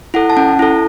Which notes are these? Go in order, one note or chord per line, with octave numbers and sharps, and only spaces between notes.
E4 A4 F#5
A5
C#4 F#5
E4 A4